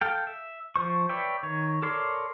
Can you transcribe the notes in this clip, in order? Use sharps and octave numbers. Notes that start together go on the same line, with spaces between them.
A4 F5 G5
E5
F3 C5 C#6
B4 C#5 D5 E5 G5
D#3 C#5
A4 A#4 C#5 D5 C6